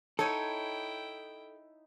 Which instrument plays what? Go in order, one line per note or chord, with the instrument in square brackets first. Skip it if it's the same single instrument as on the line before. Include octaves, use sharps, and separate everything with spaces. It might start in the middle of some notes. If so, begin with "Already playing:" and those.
[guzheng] D#4 C#5 G#5 [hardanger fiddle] E4 G5 [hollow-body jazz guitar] A4